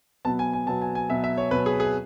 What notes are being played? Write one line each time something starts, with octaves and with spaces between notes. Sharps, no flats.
B2 F#3 B3 A5
G#5
G#5
B2 F#3 B3 A5
G#5
G#5
B2 F#3 B3 E5
E5
C#5
B2 F#3 B3 B4
G#4
G#4